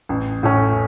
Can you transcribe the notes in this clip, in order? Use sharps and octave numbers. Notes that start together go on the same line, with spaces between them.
A1
A2 A3 C#4